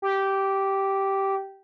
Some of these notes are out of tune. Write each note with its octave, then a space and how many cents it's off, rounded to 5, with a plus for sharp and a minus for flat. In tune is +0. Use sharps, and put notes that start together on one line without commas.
G4 -10